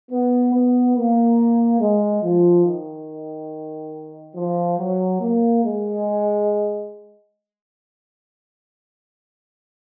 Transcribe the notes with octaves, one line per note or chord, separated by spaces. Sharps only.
B3
B3
A#3
G#3
F3
D#3
F3
F#3
A#3
G#3